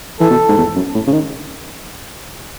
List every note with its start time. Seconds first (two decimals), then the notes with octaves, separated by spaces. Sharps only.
0.20 E3 A4
0.30 B2
0.48 G#2
0.57 E2
0.75 F#2
0.94 A2
1.07 C#3
1.13 D#3